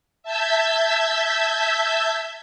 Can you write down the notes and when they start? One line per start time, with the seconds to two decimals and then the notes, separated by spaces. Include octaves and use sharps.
0.23 E5 A5 E6 G6 G#6 B6